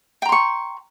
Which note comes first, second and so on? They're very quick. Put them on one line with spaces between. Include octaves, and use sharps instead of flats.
G5 A#5 C6 C#6